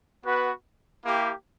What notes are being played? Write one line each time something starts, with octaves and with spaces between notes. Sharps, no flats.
B3 F#4 B4
A#3 E4 G4